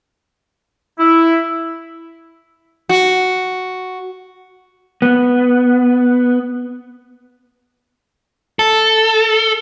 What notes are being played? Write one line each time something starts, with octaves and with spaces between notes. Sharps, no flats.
E4
F#4
B3
A4